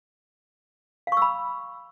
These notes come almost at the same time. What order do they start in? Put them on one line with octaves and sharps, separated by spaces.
F5 C#6 E6 B5